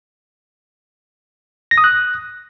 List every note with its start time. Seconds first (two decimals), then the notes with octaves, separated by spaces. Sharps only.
1.71 A#6
1.78 D#6
1.84 F#6